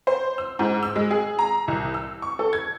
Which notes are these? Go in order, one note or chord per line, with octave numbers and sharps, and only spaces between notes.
C5
E6
G#2
E6
G#3
G#4
A#5
C2
E6
C#6
A4
G#6